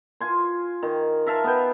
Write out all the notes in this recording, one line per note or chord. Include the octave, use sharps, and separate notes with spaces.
F4 G#5 C6
D#3
A#4 E5 F5 A5
B3 B4 G5